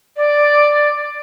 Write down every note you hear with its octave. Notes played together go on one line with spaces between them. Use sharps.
D5